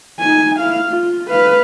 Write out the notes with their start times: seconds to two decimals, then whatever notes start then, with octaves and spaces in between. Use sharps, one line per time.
0.19 D#4 G#5
0.59 E4 F5
0.91 F4
1.30 B4 F5